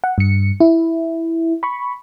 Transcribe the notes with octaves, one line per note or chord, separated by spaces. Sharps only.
F#5
G2 C#7
E4
B5 C#6